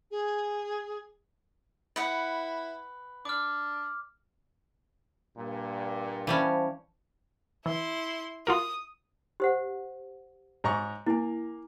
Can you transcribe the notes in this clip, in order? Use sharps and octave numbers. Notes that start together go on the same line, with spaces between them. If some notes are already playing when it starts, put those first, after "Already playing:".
G#4
E4 B4 F#5
D4 D6 F6
G2 A#2
E3 G3 C#4 C5 F5 A5
E3 E4 C6
F4 F#4 A#4 D#6
G4 C5 F#5
G#2 A#5 C#6
A#3 E4 G#5